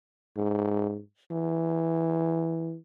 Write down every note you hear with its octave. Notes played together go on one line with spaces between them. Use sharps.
G#2
E3